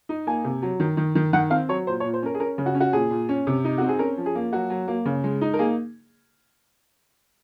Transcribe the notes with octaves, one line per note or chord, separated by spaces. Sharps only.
D#4
A#3 G#5
C3
F#3
D#3
D#3
D#3
D#3 F#5
C4 F5
F#3 C#5
A#2 C5
C#5
A#2
C5
C#4 A#4
G#4
C#4 A#4
C#3
F#4
C#4
F#4
A#2 G#4
A#2
C#4
C3
D#4
C4 F#4
G#4
C#4 A#4
F3
G#4
A#3
F#3 F#4
F#3
A#3
C#3
G#3
D#4
A#4
A#3 G#4